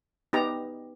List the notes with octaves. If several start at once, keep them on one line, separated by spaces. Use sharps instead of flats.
B3 D#4 G4 A#5